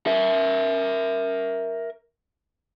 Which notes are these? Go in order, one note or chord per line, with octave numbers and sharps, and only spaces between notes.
A#4 E5